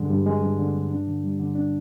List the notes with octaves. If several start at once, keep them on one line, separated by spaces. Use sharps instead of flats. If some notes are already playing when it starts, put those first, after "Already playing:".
Already playing: G2 D3 G#3
G2
G#3
G2
D3
G2
D4
D3
G3
D3
D4